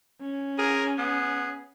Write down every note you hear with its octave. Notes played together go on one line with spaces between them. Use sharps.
C#4
G#4 A#4
B3 G#4